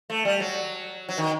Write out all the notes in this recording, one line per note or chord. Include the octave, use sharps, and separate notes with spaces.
A3
G3
F#3
F#3
D#3